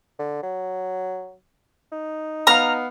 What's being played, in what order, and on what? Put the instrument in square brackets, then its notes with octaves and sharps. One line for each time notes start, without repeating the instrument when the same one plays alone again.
[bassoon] D3
F#3
D#4
[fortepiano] B3 F5 [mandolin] A#5 F6